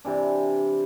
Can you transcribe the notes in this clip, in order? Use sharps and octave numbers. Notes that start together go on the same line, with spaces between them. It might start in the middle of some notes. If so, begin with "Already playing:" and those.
C3 E3 D4